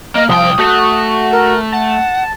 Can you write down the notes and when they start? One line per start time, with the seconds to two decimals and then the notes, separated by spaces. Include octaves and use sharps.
0.15 A#3 D#5
0.29 C2 F3 G5 D#6
0.59 A3 F#4
1.31 A#4
1.72 F#5 A5